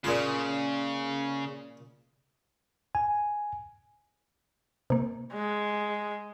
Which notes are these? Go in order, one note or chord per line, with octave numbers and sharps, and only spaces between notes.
A#2 C#3 G#3 F4
G#5
C3 A#3
G#3